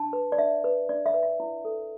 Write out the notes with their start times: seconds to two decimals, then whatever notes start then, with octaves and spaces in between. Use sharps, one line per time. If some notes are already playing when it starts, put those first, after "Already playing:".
Already playing: D4 A5
0.13 B4
0.32 D5
0.38 D4 E5
0.64 B4
0.89 D4 D5
1.06 E5
1.14 B4
1.23 E5
1.40 E4
1.65 A4